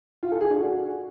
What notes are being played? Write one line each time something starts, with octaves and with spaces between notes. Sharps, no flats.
F4
A4
G#4
D4
F#4